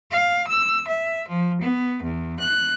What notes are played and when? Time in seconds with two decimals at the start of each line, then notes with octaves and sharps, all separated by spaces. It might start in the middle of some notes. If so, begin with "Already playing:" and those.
0.10 F5
0.47 E6
0.88 E5
1.26 F3
1.61 B3
2.02 E2
2.39 F#6